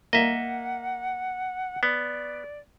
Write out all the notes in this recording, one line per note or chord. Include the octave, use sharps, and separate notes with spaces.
A#3 D#5 E5 F#5
B3 D5